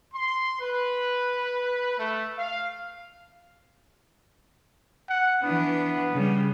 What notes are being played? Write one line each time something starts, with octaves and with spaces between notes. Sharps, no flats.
C6
B4
A3
F5
F#5
E3 B3 D4
C#3 G3